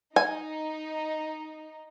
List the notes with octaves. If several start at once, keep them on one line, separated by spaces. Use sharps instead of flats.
D#4 G#5